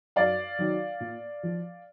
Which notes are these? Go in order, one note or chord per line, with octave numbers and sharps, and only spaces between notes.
F#2 D5 F5
D#3 F#3
A#2
F3